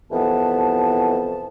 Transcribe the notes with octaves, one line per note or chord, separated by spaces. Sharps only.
C2 F2 E3 B3 A5